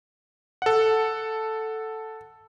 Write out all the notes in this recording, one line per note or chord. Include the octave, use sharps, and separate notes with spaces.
A4 F#5